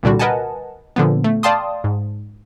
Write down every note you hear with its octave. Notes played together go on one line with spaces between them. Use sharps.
C2 A#2 D3 G3 F#4
A#4 B4 D#5 F#5 G#5 A5
A#2 D3 F3 B3
A3
D5 F5 G5 A5 C6 D#6
G#2